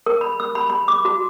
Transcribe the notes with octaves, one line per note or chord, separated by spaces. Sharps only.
A#4
B5
E6
B5
B5
D6
F#4